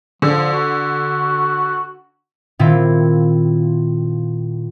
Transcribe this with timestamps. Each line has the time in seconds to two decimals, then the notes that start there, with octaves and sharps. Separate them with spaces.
0.22 D3 F3
0.52 F#4
2.59 A#2 D#3 C4 E4 F4